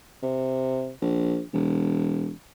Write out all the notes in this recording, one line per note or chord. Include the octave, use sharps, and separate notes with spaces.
C3
A#1
E1